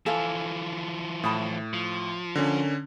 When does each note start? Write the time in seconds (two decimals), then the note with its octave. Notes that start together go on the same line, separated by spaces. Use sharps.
0.06 E3 F3 A4 F5 G#5
1.24 A2 A5 B5 D#6
1.74 F3
2.35 D3 C#4 A#4